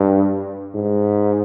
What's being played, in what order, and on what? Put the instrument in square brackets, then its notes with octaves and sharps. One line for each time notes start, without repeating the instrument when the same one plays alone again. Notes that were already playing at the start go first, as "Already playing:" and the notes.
Already playing: [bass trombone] G2
G#2